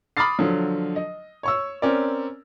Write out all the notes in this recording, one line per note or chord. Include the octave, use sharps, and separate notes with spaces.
B5 D6 D#6 F6 A6 C7
D3 F3 F#3
D#5
C#5 C#6 E6
C4 C#4 A#4 D5